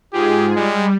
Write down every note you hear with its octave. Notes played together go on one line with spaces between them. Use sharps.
G#2 F4 G4 G#4
G3 G#3